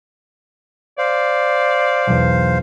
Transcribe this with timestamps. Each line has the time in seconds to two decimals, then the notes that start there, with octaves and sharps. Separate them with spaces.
0.98 C5 D5 F5
2.07 B1 E2